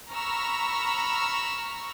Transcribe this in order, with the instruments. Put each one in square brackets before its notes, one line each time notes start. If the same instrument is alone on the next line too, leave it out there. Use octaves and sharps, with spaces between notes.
[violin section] A#5 B5 C#6 E6 F6